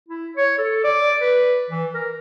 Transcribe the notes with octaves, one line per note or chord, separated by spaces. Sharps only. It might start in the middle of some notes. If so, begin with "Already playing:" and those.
E4
C#5
A4
D5
B4
E3
A#4